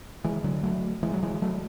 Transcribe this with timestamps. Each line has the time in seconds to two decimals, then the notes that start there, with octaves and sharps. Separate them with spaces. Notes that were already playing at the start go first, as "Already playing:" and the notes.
0.24 E3 G#3
0.44 D3 F#3
0.63 F#3 A3
1.03 E3 G#3
1.14 F#3
1.23 E3 G#3
1.42 F#3 A3